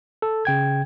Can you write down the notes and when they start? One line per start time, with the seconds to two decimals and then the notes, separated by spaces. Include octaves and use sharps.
0.22 A4
0.45 C#3 G5 G#6